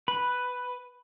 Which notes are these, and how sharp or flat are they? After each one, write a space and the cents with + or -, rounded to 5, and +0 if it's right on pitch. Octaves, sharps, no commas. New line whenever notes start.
B4 +5 B5 +0